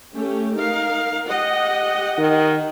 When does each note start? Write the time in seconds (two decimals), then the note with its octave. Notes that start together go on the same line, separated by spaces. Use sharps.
0.14 A3 C#4 G4
0.55 D#4 A#4 F5
1.28 G4 D#5 F#5
2.19 D#3